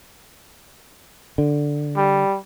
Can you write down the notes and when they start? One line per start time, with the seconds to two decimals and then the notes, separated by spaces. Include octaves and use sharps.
1.38 D3
1.96 G3